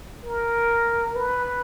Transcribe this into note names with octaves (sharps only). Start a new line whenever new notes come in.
A#4
B4